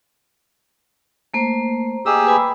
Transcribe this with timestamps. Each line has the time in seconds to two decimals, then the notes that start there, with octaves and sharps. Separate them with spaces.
1.34 A3 A#3 C5
2.06 G4 G#4 D#5 A#5 E6
2.27 B4 G#5 B5